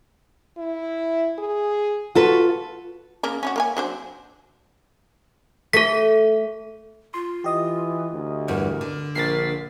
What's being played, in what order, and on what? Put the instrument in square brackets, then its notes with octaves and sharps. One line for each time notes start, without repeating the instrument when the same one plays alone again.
[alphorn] E4
G#4
[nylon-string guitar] F4 A4 B4 [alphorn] F#4
[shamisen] C#3 A#3 A#4
C#4 F4 F#4
A#3 A#4 G#5
F#3 D4 C5
[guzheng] A3 [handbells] A4 B6
[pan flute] F4 [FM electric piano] C6
[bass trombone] E3 [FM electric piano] G4 D#5 D#6
[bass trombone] D2
[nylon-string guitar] E2 G2 [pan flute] A#4
[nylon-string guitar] D3
[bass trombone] A#1 [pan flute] A#4 [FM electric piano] A6 B6 C7